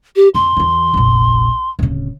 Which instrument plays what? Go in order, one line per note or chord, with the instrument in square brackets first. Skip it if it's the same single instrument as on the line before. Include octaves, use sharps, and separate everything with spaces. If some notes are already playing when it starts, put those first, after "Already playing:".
[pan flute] G4
[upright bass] F2 [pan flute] C6
[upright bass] E2 E3
F1 A#1
D1 C#3